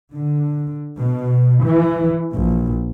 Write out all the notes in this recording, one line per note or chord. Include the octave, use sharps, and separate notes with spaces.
D3
B2
E3
A#1